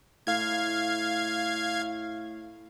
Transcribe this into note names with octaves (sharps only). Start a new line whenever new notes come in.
A2 F5 G#6